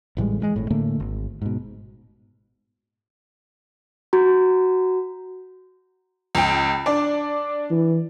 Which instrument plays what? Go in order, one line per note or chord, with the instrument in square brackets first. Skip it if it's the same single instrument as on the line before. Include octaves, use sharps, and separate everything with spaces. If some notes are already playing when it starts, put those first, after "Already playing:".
[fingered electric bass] A1 A2 G3 G#3
E3 F#3 G#3
G#1 A2
A2 D3 A3 A#3
G#1
G#2 B2
[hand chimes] F#4 A#5
[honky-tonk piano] C#2 G5
D4 D5
[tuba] E3